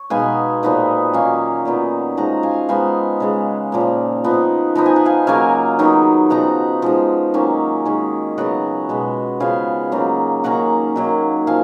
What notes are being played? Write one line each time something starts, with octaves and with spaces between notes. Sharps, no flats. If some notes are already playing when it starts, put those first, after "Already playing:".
Already playing: C#5
B2 G#3 B3 D#4 F5 G#5
A#2 F3 B3 D#4
D#3 F#3 A#3 C#4 F5 G#5
A#2 F#3 B3 D#4
F3 G#3 D#4 F#5 A#5
F5 G#5
F3 G#3 B3 D#4 F5 G#5
C#3 G#3 B3
A#2 F3 A#3
F3 B3 D#4
F3 B3 D#4 A#5
G#5
F#5
F5 G#5
C#3 F#3 A#3 F5 G#5
D#3 F#3 B3 D#4
C#3 F3 B3 D#4 F#5 A#5
F3 G#3 D#4
D#3 F#3 A#3 C#4
D#3 G#3 C#4
C#3 F#3 B3 D#5 F#5
B2 G#3 B3
C#3 F3 B3 F5 G#5
C#3 F#3 A#3 D#4
D#3 A#3 C#4 F#5 A#5
D#3 F#3 A#3
F3 F5 G#5